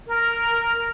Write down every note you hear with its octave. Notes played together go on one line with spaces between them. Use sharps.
A#4